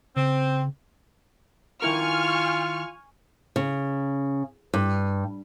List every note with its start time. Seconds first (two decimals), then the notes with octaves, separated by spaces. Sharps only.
0.16 C#3 C4
1.82 D#3 E4 F4 A#4 G#5 C#6 F6
3.56 C#3
4.74 G2